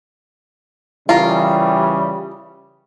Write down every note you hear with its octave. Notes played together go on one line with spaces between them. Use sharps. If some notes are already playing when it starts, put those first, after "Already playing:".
C#3 E3 G3 F4 A#4